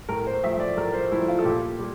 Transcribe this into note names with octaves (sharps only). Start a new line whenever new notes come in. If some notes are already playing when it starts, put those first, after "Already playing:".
A2 A#4
C5
F3 A3 E5
D5
A2 A#4
C5
F3 A3 E4
F4
A4
A#2 G4
G3